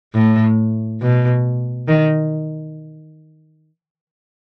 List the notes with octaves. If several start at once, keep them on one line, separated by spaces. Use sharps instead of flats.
A2
B2
D#3